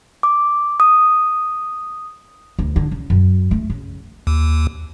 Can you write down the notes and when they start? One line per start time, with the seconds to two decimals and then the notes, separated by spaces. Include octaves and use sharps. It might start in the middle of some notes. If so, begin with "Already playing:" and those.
0.23 D6
0.80 D#6
2.59 D2
2.76 D3
2.91 C#3
3.10 F#2
3.51 A3
3.70 C#3
4.27 D#2